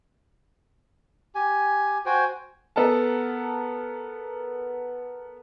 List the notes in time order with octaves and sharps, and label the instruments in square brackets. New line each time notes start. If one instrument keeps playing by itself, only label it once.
[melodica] G4 G#5
F#4 C5 G5 G#5
[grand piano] B3 A4 A#4 A5